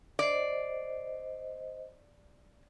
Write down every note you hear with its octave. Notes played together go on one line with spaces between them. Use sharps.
C5 D5 D#5